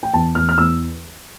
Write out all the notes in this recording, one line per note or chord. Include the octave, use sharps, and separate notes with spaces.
G5
E2 A5
E2 F6
F6
E2 E6